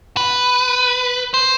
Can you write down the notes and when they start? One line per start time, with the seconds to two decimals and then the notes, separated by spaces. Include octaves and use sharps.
0.17 B4
1.34 C5